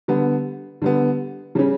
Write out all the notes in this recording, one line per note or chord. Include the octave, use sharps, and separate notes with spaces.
D3 G3 B3
D3 G3 B3
C#3 G3 C#4